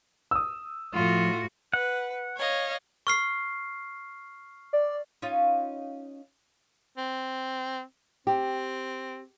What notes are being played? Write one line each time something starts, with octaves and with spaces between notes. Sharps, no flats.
D#6 E6
A2 F3 F4 F#4
B4 F#5
C#5 D#5 F5
C#6 F6 C7
D5
C#4 D#4 F4
C4
C4 G4